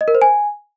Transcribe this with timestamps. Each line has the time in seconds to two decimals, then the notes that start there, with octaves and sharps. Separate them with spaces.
0.01 D#5
0.08 A#4
0.15 C5
0.22 G#5